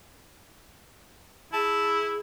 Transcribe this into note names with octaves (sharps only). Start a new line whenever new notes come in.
E4 G#4 A5